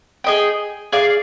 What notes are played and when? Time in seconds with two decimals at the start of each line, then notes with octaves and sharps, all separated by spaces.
0.24 G#4 D#5 G5
0.92 G#4 D5 F5